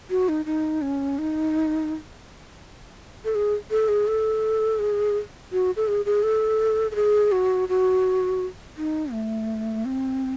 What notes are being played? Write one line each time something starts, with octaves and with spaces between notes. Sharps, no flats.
F#4
D#4
D#4
C#4
D#4
A4
G#4
A4
G#4
A4
G#4
F#4
A4
G#4
G#4
A4
A4
G#4
F#4
F#4
D#4
A3
C4